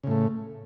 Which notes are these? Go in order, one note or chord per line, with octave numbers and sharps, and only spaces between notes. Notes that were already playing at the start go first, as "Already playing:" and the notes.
A2 C#3 A3